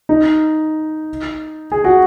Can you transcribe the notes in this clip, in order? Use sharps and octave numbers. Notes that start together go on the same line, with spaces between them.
D#4
G#4
F#4